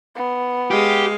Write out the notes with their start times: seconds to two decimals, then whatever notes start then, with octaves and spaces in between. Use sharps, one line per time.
0.16 B3
0.71 G#3 G4 F5